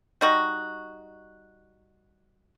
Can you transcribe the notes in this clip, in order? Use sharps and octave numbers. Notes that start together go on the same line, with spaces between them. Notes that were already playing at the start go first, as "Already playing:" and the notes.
G3 D#4 F#4